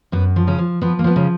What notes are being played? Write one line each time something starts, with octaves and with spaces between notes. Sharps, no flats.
F#2 B3
F3
C#3 C#4
F3
F3 B3
A#3
F3 B3
C#3 C#4